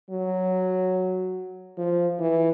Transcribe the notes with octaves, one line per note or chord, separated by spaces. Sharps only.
F#3
F3
E3